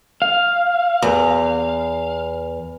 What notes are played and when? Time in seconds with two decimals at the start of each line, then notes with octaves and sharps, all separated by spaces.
0.22 F5
1.02 E2